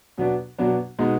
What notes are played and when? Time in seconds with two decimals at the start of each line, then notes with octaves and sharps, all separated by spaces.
0.18 B2 F#3 B3 D4
0.58 B2 F#3 B3 D4
0.99 B2 G#3 B3 D#4